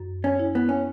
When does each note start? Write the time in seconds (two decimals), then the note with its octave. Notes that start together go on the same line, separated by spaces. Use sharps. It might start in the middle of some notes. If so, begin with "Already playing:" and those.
Already playing: F#2
0.24 C#4
0.40 E4
0.55 B3
0.69 C#4